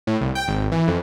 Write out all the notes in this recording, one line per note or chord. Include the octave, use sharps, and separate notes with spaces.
A2
C2
G5
G#1
E3
F2